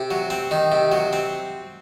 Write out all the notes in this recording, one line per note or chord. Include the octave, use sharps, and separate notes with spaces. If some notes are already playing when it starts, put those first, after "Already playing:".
Already playing: C3
F#3
C4
D#3
C3
F#3
C4